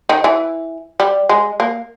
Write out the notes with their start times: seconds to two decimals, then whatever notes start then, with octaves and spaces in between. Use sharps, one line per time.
0.09 D#3
0.24 E3
1.00 G3
1.29 G#3
1.60 A#3